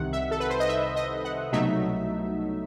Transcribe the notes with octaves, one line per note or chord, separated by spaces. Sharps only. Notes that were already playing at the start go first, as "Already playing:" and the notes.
Already playing: C2 C3 D#3 F#5
E5
A4
B4
C5
D#5
E5
D#5
F#5
C2 B2 F#3 A3 D#4 E5